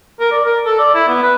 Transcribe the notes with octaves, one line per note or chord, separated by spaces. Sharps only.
A#4
D5
A#4
A4
D5
E4
B3
B4